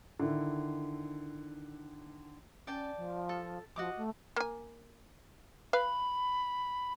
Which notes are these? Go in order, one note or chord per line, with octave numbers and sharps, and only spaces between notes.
D3 D#3 E4
C#4 D5 G5 A5
F3
A4
F3 F#4 D#5 D6
A3
A#3 G#5
B4 F5 B5